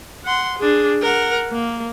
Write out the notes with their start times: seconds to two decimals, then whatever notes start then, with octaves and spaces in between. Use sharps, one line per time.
0.25 F#5 C6
0.59 D4 G#4
1.02 A#4 F#5
1.52 A#3